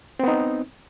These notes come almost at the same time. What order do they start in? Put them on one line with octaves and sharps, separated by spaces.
C4 B3 D#4